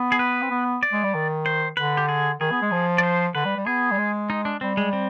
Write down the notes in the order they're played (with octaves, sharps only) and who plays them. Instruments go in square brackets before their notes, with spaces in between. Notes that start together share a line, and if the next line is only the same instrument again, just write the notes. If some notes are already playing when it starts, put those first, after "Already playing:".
Already playing: [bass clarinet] B3
[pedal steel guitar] G#4
B4
[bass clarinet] C4
B3
[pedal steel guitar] D5
[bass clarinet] G#3
G3
D#3
[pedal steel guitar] C5
[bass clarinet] D3 [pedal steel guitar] B4
[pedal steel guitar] G4
G#4
[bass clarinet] D#3 [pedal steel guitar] G#4
[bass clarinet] B3
G#3
F3
[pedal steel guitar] D5
C5
[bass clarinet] D3 [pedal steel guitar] B4
[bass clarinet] G3
G3
[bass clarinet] B3 [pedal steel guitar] G#4
[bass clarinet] G3
G#3
[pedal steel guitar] D#4
D4
[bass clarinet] G3 [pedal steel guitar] C4
[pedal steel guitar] G#3
C4